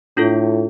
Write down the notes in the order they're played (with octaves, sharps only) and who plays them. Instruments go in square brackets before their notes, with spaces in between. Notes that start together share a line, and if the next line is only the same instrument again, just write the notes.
[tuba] A2 [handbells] D4 F4 A4